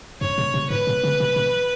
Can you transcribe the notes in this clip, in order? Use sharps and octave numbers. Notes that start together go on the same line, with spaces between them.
F#2 C#5
A#2
B2
G#2 B4
A#2
C#3
B2
A#2